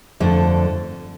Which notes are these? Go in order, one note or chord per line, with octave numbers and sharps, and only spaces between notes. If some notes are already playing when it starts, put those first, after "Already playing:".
F2 D3 A3